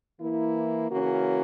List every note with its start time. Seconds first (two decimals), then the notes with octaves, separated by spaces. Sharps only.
0.20 E3 A#3 E4
0.90 C#3 E3 A#3 C#4 F#4